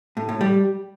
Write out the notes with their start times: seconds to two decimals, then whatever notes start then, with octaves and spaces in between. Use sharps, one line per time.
0.17 A2
0.29 A2
0.41 G3